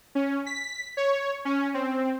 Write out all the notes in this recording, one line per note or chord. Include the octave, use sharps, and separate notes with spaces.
C#4
B6
C#5
C#4
C4